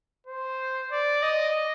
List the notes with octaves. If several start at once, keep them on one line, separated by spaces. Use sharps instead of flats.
C5
D5
D#5